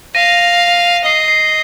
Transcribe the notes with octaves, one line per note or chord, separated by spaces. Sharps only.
F5 A#6 D#7
D#5 C7
C7